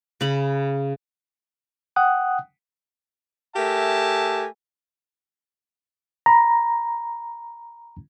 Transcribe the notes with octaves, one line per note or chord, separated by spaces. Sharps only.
C#3 B5
F#5 G5 D#6 F#6
A3 G4 A#4 E5 G#5 A5
A#5 B5